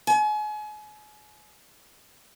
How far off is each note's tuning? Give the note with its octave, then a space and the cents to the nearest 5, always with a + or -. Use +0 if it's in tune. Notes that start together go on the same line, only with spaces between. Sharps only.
G#5 +35